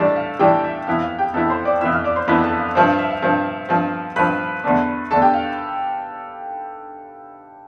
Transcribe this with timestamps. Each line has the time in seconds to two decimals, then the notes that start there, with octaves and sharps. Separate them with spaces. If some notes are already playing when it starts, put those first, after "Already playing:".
Already playing: A2 E3 G3 D4 A4 A5
0.16 F5
0.39 A2 E3 G3 D4 G4 G5
0.64 E5
0.87 F2 E3 B3 E4 F5
1.02 F5
1.19 G4 G5
1.34 F2 E3 B3 E4 A4 A5
1.50 C5 C6
1.65 D5 D6
1.81 F2 E3 B3 E4 E5 E6
1.92 F5 F6
2.04 D5 D6
2.16 C5 C6
2.28 F2 E3 B3 E4 B4 B5
2.43 A4 A5
2.59 F5
2.75 G2 F3 C4 E5
2.88 F5
2.98 E5
3.11 F5
3.22 G2 F3 C4
3.69 G2 F3 C4
4.16 G2 F3 C4 B4 B5
4.64 E2 D3 A3 D4
5.11 E2 D3 A3 D4 A4 A5
5.22 G4 G5
5.34 F5